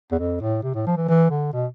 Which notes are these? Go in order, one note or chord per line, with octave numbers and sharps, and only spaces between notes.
E2
F2
A2
C3
A2
F3
E3
E3
D3
B2